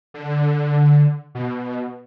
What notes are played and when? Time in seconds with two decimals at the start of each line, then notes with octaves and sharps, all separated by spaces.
0.14 D3
1.35 B2